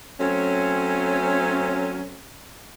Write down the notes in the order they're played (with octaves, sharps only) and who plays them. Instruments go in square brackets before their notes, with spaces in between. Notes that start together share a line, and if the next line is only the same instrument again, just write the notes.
[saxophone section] F#3 A3 C4 C#4